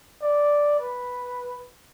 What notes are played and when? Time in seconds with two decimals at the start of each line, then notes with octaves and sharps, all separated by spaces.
0.22 D5
0.80 B4